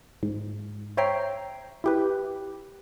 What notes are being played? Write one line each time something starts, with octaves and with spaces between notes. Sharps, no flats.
G#2
C5 C#5 E5 G5 A#5 C7
E4 G4 B4